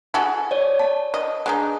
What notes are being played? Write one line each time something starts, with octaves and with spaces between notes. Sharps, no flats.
F#4 G#4 A4
C#5 D5
A5
D#5
G#3 D4 D#4